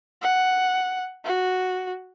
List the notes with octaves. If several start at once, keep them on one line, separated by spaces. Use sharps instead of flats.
F#5
F#4